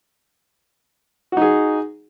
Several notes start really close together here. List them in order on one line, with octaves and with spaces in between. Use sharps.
F#4 D#4 G#4